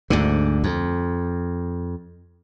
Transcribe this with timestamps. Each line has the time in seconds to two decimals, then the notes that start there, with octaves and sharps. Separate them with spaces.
0.10 D2 G#2 D3
0.64 F2